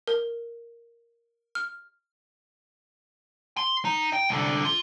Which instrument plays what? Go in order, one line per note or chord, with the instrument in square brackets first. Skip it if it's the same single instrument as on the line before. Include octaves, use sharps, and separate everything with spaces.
[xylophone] A#4
F6
[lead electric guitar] C6
D#4
G5
C2 D3
F4